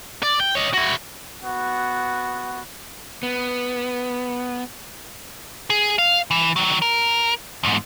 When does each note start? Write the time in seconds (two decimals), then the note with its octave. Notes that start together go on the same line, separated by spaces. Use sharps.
0.23 D5
0.40 G5
0.55 C#5 D#5
0.74 E4 F#4
1.43 B3 F#4
3.23 B3
5.70 G#4
5.98 F5
6.31 E3
6.56 D#3 F#3
6.82 A#4
7.64 E2 G#2